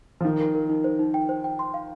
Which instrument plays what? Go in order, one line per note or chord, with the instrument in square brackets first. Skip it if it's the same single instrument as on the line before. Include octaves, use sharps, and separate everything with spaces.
[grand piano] F3
[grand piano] D#3 [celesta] A#4
[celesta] A#4
A#4
D#4
C5
D#4
G5
C5
G5
C6
F5